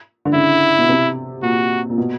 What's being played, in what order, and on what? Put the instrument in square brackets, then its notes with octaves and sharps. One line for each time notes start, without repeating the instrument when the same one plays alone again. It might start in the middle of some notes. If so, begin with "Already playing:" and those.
[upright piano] D3
[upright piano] C#3 [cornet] E4
[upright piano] B2
C3
[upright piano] A#2 [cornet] F#4
[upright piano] A#2
B2